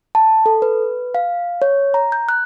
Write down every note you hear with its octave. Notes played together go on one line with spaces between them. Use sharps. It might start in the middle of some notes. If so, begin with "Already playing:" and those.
A5
A4
B4
F5
C#5
A#5
G6
F#6